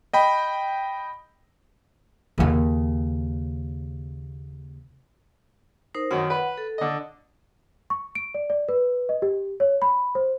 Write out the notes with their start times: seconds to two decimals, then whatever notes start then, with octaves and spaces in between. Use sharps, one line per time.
0.13 D#5 G5 B5
2.38 D#2 C#3
5.95 D#4 A#4 C5
6.11 F#2 D#3 F#5
6.30 B4
6.58 A4
6.78 D3 D#5
7.90 C#6
8.15 D7
8.34 D5
8.50 D5
8.69 B4
9.09 D#5
9.22 G4
9.60 C#5
9.82 B5
10.15 C5